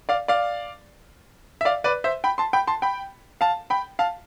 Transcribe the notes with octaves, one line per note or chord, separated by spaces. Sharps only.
D5 F5
D5 F5
E5
D5 F5
B4 D5
C5 E5
G5 B5
A5 C6
G5 B5
A5 C6
G5 B5
F5 A5
G5 B5
F5 A5